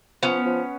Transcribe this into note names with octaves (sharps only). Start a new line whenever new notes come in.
F3 B3 C#4
F3